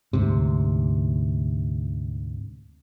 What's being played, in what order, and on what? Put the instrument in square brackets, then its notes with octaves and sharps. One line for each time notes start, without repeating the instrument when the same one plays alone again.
[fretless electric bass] D2 G#2 C3